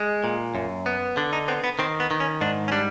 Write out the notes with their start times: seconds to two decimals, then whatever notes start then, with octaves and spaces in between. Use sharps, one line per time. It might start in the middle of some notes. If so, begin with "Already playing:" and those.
Already playing: G#3
0.24 A#2
0.55 F#2
0.86 B3
1.17 D3 D4
1.33 D#4
1.48 B3 C4
1.64 B3
1.79 D#3 C4
2.00 B3
2.11 D#3
2.20 C#4
2.41 G#2 D4
2.68 C#4
2.72 G3 D4